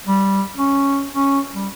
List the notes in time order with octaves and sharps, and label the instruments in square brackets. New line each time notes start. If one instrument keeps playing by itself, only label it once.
[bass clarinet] G3
C#4
C#4
G3